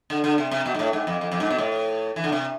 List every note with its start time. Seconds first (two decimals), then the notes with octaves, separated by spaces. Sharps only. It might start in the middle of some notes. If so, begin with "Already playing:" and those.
0.10 D3
0.24 D3
0.38 C3
0.51 C3
0.66 B2
0.74 G#2
0.79 A2
0.93 G#2
1.07 F2
1.21 F2
1.32 F2
1.40 G#2
1.50 B2
1.58 A2
2.16 E3
2.24 D3
2.32 C3